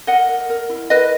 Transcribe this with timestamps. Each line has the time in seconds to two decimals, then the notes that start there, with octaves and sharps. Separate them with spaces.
0.07 A#4 D#5 F#5
0.28 A#4
0.50 A#4
0.69 E4
0.90 A#4 B4 D#5